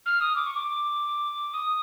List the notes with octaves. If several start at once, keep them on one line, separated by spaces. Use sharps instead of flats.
F6
D#6
D6
C#6
D6
D#6